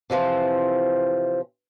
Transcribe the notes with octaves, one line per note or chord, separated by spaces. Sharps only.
C3 E3 F3 C4